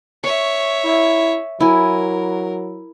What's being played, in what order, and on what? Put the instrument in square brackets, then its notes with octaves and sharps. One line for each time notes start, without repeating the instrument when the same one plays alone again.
[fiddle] C#5 E5 [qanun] C#6
[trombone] E4
[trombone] F#3 [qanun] E4 G#5 [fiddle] A#4